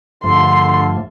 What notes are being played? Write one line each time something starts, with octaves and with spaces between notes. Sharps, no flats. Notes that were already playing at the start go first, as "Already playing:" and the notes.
G2 D3 F3 A3 C6